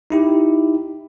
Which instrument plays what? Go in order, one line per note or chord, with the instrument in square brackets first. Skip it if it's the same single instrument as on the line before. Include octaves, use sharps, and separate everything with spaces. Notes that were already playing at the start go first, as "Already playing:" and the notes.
[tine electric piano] D#4 E4 G4